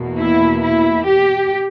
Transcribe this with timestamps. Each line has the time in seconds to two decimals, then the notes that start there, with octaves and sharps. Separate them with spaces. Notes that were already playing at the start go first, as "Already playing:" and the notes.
Already playing: E2 B2 A#3
0.17 E4
0.62 E4
1.07 G4